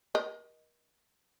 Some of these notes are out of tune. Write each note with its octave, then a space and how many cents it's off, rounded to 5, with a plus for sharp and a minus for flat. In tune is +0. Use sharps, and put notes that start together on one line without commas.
A#4 +40 D#5 +0